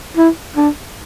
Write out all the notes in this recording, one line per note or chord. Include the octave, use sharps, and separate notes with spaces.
E4
D4